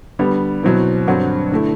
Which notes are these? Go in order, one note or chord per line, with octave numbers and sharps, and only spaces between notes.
D3 G3 B3
B2 F#3 C4 E4
G2 D3 F#3 C4 F#4
D3 A3 E4